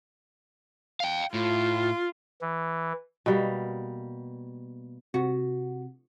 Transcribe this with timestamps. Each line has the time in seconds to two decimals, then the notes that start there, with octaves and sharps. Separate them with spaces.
1.00 F5 G5
1.34 A2 F4
2.41 E3
3.26 B2 G3 A#3
5.14 C3 F#4